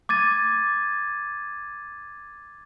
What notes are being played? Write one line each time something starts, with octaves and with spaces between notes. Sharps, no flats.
D6 G#6 A6 D#7